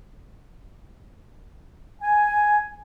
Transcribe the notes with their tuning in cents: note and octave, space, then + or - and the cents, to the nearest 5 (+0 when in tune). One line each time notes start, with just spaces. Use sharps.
G#5 +5